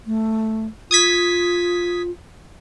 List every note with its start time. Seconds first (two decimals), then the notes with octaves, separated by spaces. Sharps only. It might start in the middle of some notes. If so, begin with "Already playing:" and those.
0.07 A3
0.91 F4 D#6 G#6 B6